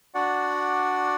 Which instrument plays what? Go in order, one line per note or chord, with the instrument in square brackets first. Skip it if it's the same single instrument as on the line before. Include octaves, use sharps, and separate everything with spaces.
[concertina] D4 F#4 D5 F#5